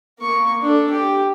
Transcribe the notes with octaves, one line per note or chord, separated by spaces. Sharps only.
A#3 C#6
D4 A4
G4